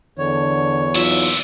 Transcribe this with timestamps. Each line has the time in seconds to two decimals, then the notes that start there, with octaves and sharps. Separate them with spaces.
0.18 E2 D3 C#5
0.95 A#2 F#3 D#4 F4 E5